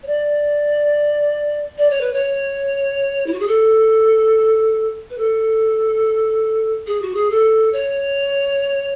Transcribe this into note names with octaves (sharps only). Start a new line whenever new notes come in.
C#5
D5
D5
C#5
B4
C#5
E4
F#4
G#4
A4
B4
A4
G#4
F#4
G#4
A4
C#5